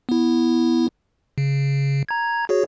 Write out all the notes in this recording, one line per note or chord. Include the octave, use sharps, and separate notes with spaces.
B3 E4
C#3
A#5 G#6
F#4 G#4 C#5